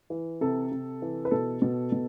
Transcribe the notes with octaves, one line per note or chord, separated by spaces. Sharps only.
E3
C3 A4
C3
E3
B4
B2 A4
B2
B2